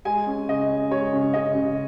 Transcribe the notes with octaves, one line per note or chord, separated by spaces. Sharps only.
G#3 G#5
C#4
C#3 D#5
C#4
G#3 C#5
C#3
C#3 D#5
C#3